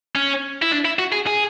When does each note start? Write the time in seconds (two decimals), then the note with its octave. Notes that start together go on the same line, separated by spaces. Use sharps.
0.15 C#4
0.62 E4
0.72 D4
0.85 E4
0.99 F#4
1.12 G#4
1.27 G#4